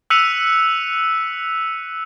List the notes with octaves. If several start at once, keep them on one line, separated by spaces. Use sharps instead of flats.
E6 F#6 B6 C#7 D#7 F7